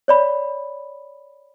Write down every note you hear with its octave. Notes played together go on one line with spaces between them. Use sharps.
C#5 D5 B5